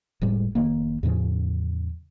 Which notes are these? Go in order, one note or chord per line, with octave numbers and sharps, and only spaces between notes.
F1 A2 G3 G#3
F1 D#3 A#3
E2 A2 C#3 F3